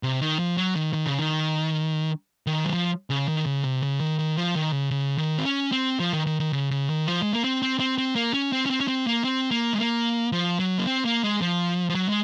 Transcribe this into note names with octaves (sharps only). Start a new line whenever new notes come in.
C3
D#3
F3
F#3
D#3
D#3
C#3
D#3
D#3
F#3
F3
C#3
D#3
C#3
C3
C#3
D#3
D#3
F3
D#3
C#3
C#3
D#3
C4
C#4
C4
F3
D#3
D#3
D#3
C#3
C#3
D#3
F3
G#3
A#3
C4
C4
C4
C4
A#3
C#4
C4
C#4
C4
C#4
C4
A#3
C4
A#3
G#3
A#3
F3
F#3
A#3
C4
A#3
G#3
F3
F3
F#3
G#3